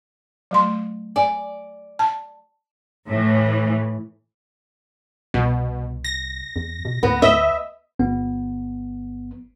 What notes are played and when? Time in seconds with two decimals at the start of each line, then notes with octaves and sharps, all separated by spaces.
0.51 F#3 A3 C6
1.16 D5 G#5
1.99 A5
3.08 A2 E3
5.34 C2 B2
6.04 A#6
6.56 E2
6.85 B2
7.03 D2 B3
7.22 D#5 E5
7.99 G1 B3